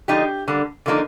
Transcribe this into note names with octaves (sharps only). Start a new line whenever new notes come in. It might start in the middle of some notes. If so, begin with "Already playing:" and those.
D3 F3 G#3 D#4 G4
D3 G3 A#3
D3 F3 A#3 D#4